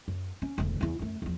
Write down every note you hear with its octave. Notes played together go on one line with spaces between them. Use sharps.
F#2
C#4
E1 D2
E2 E4
F#2 A3
E2 F3